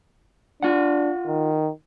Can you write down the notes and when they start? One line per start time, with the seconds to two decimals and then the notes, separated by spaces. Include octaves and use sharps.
0.63 D4 F4 F#5
1.27 D#3